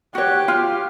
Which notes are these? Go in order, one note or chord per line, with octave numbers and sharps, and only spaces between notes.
F#4 G4 C#5 F#6
F4 F6